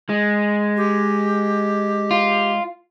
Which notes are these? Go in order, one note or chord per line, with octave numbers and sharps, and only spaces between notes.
G#3
G4
F4